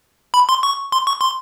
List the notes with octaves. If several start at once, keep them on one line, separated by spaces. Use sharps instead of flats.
B5
C6
C#6
C6
C#6
C6